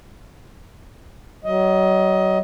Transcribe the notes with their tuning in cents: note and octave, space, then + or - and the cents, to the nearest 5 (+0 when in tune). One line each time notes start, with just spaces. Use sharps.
F#3 +35 D#5 +20